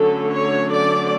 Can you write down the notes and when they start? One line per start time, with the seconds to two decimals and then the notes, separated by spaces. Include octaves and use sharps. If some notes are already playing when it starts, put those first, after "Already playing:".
Already playing: D3 F#3 A3 C#4 A4
0.33 C#5
0.72 D5